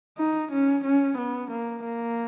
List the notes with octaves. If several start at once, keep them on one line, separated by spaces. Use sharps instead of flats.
D#4
C#4
C#4
B3
A#3
A#3